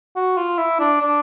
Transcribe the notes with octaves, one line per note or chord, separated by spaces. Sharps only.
F#4
F4
E4
D4
D4